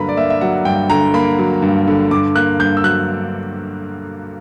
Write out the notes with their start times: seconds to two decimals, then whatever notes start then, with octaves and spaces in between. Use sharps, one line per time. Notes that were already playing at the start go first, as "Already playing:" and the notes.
Already playing: G2 D3 F#3 A#3 B4 A#5 B5
0.09 D5
0.17 A#3 E5
0.30 E5
0.41 F#3 F#5
0.65 G2 G5
0.90 D3 A#5
1.14 A#3 B5
1.39 F#3
1.62 G2
1.87 D3
2.11 G2 D6
2.35 A#3 F#6
2.59 G2 G6
2.77 E6
2.84 F#3 F#6